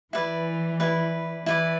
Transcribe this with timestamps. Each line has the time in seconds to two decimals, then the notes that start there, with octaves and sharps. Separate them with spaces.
0.12 E3 E4 B4 D5
0.80 E4 B4 D5
1.46 E3 E4 B4 D5